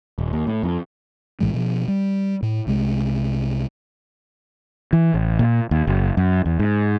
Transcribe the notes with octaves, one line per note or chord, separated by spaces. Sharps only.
D#1
D#2
A2
F2
B1 A2 E3 G#3
B2 F3
G3
A2
C2 C3 G#3
E3
A1
A#2
D#2
F#1
F#2
E2
G#2